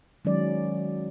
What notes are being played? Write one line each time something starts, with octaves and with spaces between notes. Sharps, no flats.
D#3 F#3 G#3 C#4 D5